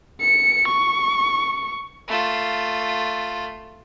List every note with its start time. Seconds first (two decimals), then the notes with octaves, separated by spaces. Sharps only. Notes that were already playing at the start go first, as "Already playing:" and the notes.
0.20 C#7
0.68 C#6
2.08 A3 F4